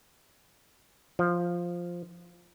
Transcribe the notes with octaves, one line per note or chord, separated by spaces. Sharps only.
F3